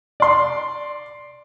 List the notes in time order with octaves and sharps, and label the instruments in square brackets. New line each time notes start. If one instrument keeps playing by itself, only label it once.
[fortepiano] D5 C6